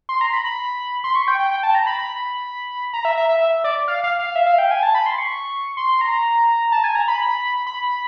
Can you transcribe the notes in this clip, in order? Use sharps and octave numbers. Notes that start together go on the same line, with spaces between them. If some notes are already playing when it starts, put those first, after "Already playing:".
C6
A#5
B5
B5
C6
C#6
G5
G5
G5
A5
A#5
B5
B5
A#5
E5
E5
E5
E5
D5
F5
F5
F5
E5
F5
G5
G#5
A5
B5
C6
C#6
C6
A#5
A5
G#5
A#5
B5
B5